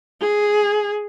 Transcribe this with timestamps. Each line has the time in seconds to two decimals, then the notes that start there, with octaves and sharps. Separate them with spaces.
0.21 G#4